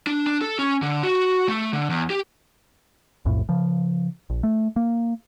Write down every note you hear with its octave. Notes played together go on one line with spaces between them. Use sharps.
D4
D4
A4
C#4
D3
F#4
A3
D3
E2
G4
B1 F2 A2
C#3 F3
A#1
A3
A#3